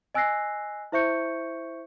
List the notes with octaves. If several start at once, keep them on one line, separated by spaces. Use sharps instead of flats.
D#5 G#5 E6 F#6 A#6 C7
E4 C5 E5 C#6 G6 C#7